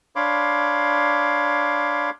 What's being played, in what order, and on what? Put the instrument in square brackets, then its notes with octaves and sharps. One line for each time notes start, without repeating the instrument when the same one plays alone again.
[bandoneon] D4 C#5 F5 B5 C6 D6